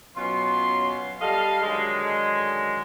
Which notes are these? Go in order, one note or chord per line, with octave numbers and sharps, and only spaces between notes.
B2 F#3 C#4 F4 C6
G3 A4 D#5 F5
D3 D#3 F#3 G#3